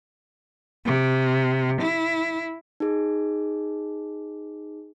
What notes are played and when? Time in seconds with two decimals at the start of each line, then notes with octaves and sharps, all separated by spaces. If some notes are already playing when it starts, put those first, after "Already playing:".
0.86 C3
1.81 E4
2.80 D#4 G#4